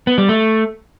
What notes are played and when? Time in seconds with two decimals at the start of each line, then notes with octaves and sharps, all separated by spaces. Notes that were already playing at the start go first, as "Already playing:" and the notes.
0.07 B3
0.18 G3
0.29 A3